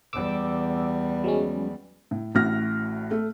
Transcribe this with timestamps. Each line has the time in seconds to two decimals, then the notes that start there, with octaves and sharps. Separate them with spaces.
0.13 E2 G3 D6 E6
1.24 F#3 G#3 C#4
2.11 A2
2.35 A1 A2 F#4 F6 A#6
3.11 A3